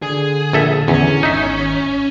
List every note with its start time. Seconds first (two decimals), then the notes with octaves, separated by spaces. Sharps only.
0.02 D3 G#4
0.53 A#1 A4 E5
0.88 E2 C#4
1.23 G#1 D#4 E5